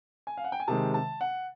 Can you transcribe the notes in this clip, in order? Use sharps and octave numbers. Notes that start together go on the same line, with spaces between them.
G#5
F5
F#5
G5
G#5
C3 D#3 G#3 A5
A5
F#5